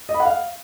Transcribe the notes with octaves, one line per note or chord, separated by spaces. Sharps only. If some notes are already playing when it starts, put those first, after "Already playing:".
D#5
B5
F#5
F5